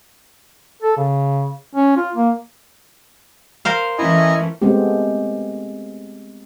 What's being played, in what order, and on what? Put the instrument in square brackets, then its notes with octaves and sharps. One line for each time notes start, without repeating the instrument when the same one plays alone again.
[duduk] A4
C#3
C#4
F4
A#3
[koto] A#4 C5 F5
[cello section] E3 A3 C#4 [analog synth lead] E4 [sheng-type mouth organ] D#5 G#5 A#5
[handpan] G#3 A3 B3 C4 G4